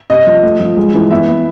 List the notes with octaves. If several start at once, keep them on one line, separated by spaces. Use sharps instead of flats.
C3 D#5
F3
A3
F3
G#3
E3
B3 E5
B3